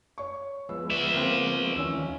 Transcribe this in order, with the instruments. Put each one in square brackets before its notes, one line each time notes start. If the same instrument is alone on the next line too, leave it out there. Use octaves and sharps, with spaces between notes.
[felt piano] C#5 C#6
[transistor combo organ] F3 G#3 B3 [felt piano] E6
[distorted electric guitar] D5 E5
[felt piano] A#3 C4
[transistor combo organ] D#2 E3 F3 [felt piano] C#4 E6